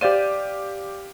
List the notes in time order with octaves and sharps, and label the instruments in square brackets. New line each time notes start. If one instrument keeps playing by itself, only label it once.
[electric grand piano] G4 F5 D#7 [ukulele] C5 D5